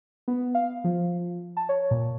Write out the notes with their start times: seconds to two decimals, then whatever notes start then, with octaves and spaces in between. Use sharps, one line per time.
0.28 B3
0.55 F5
0.84 F3
1.57 A5
1.69 C#5
1.91 A#2